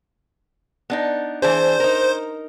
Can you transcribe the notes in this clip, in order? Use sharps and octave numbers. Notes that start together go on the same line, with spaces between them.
B3 D4 D#4
E3 D4 G#4 C5
D#4 A#4